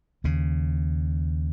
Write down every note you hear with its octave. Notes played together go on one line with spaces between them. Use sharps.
D#2 C#3